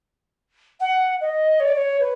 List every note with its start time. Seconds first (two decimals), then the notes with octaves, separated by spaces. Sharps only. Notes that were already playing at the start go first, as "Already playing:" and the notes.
0.80 F#5
1.20 D#5
1.59 C#5
1.67 D5
1.75 C#5
2.00 B4